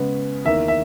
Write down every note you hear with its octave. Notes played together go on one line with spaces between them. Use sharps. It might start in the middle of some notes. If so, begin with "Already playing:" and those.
Already playing: C#3 G#3 B3
E2 D#3 A#3 E5
E5